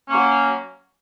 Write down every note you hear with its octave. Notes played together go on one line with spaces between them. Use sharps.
F#3 A#3 C#4